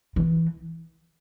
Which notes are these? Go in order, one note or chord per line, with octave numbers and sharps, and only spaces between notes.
E3